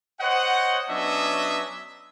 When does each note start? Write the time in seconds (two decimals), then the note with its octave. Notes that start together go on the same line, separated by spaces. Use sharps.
0.20 C5 C#5 D#5 F#5
0.89 F#3 B3 C#4 D4 D#5 E5